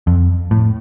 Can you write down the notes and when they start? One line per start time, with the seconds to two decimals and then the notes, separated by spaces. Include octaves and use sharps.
0.07 F2
0.51 A2